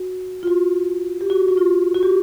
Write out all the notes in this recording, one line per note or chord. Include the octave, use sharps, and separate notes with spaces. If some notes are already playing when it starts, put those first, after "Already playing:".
Already playing: F#4
F4
F#4
G4
F#4
F#4
F4
F#4
G4